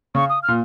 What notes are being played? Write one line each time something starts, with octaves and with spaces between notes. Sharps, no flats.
C#3 C#6
D#6
F6
A#2